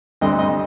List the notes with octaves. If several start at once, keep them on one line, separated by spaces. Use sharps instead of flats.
D2 D3 G3 C4 D#5
D#5